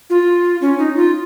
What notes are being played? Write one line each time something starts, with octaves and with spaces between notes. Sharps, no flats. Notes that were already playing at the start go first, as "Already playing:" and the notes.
F4
C#4
D#4
F4